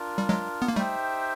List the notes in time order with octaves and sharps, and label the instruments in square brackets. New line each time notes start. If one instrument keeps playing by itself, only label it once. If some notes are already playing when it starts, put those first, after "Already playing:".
Already playing: [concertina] D4 F4 A#4
[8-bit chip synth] G3
F#3 G#3
B3
A#3
[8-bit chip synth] G3 A3 [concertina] D#4 G4 C5 E5 G5